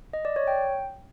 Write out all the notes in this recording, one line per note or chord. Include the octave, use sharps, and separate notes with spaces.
D#5
D5
C#5
G5